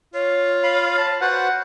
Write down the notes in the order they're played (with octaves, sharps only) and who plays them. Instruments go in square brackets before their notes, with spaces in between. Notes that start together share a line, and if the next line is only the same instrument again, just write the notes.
[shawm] F4 [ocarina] C#5
[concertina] F5 B5
[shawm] A5
[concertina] F#4 B4 C5 [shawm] F#5